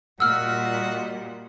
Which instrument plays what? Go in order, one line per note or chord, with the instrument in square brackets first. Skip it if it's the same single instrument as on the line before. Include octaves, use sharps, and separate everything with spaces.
[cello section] A#2 G3 [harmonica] F#4 D#5 F#5 [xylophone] E6 F6